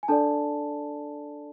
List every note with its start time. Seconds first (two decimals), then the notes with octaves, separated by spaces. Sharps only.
0.03 G#5
0.08 D4 A4 D5 A5